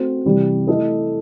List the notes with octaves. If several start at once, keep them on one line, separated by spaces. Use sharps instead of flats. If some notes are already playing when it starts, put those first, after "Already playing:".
Already playing: A3 C4 F#4 C5
C3 E3 G3
A3 E4 A4 D#5